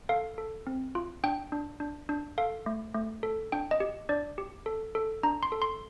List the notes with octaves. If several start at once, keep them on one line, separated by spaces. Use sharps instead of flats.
A4 F5
A4
C4
F4
D4 G5
D4
D4
D4
A4 F5
A3
A3
A4
D4 G5
D#5
G4
D4 D5
G4
A4
A4
D4 A#5
C6
A4
C6